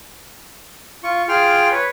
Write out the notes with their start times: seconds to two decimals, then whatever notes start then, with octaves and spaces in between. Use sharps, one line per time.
1.04 F4 C#6
1.28 F4 G#4 G5 C6 F6
1.72 B4 C#5